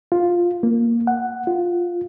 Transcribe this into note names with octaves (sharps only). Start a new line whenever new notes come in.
F4
A#3
F#5
F4